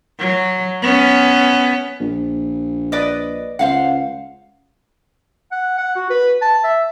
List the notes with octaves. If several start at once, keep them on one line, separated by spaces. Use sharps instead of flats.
F#3
B3 C#4
A#1
B4 D5 D#5
C#2 C5 F5 F#5
F#5
F#5
F#4
B4
A5
E5